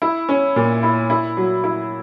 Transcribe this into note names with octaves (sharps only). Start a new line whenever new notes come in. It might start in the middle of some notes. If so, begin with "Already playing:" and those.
E4
C#4
A#2
E4
E4
F#3
E4